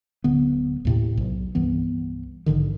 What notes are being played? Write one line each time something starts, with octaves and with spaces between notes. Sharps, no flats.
D1 D3 B3
D#2 A2 C3
B1
C2 G2 E3 B3
A#1 G#2 D3 D#3